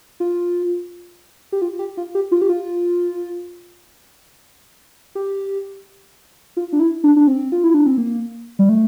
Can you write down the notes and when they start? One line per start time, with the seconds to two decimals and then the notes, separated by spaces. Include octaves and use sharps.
0.20 F4
1.52 G4
1.62 F4
1.79 G4
1.97 F4
2.15 G4
2.32 F4
2.42 G4
2.49 F4
5.15 G4
6.57 F4
6.73 D4
6.80 E4
7.04 D4
7.16 D4
7.27 C4
7.52 F4
7.64 E4
7.74 D4
7.86 C4
7.98 A#3
8.59 G3
8.69 A3